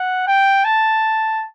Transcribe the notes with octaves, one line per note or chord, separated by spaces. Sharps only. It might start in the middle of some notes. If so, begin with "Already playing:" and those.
Already playing: F#5
G5
A5